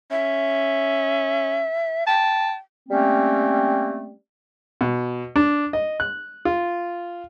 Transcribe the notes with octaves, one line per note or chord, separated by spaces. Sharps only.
C#4 E5
G5 A5
G3 A3 A#3 C4 C#4
B2
D4
D#5
F#6
F4